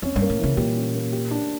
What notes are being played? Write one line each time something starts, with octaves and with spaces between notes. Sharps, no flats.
F2 C#4
G2
A#3
A2
C#3 E3
A#2 G3
C#4
A#3
G4
D4